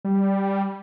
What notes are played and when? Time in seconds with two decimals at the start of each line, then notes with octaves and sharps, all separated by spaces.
0.05 G3